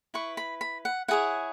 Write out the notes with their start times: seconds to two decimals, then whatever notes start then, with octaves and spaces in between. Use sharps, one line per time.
0.14 E4 B4 C#6
0.37 B5
0.61 B5
0.85 F#5
1.08 E4 G#4 C#5 F#5